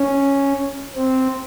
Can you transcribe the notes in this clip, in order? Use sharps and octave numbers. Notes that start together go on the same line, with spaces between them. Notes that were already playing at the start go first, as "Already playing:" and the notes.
Already playing: C#4
C4